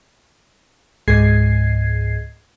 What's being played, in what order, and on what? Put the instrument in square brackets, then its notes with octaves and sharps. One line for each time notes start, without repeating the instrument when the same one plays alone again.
[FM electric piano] C#2 G#2 G#4 G#6 C7